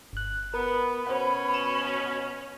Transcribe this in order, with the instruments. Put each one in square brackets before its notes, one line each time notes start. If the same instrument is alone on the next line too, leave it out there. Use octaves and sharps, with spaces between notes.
[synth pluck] G1 F#6
[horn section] B3 [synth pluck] A#4 [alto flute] B5
[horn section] B2 C#4 [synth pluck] C5 F#5
[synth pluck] E7